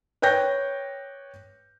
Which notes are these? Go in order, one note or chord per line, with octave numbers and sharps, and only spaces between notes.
B4 C#5 G5 G6 A#6